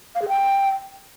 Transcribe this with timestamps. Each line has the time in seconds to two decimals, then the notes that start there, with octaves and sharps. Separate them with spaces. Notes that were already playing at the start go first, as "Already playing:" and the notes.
0.15 F5
0.22 G#4
0.29 G5